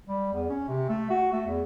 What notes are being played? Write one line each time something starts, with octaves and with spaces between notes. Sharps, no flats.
G3
E2
C#4
C3
A3
F#4
A3
E2